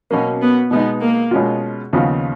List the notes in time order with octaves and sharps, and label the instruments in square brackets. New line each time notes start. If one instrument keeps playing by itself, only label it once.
[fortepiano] B2 F#3 A#3 [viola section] C#4
[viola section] B3
[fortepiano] B2 G#3 D#4 [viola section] B3
[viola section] A#3
[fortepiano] B2 G#3 C#4 F4
D#2 C#3 F3 B3 F4